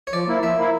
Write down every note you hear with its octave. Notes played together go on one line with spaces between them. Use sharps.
C#5
F3 D5
A#3 E4
F3 E5
A#3 E4